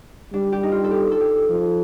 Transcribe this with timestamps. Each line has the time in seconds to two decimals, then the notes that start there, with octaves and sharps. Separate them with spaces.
0.34 G3 D4
0.52 G4
0.63 D#4
0.72 F4
0.84 A4
0.91 G4
1.11 A4
1.21 G4
1.50 F3